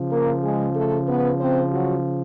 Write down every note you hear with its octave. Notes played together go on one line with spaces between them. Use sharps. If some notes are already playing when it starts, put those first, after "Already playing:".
Already playing: C#3 F3
A#3 A#4
G#3 G#4
A3 A4
B3 B4
C4 C5
F#3 F#4